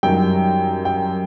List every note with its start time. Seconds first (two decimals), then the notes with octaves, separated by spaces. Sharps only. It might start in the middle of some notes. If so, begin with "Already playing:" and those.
0.03 F#2 D#3 G3 G5
0.85 G5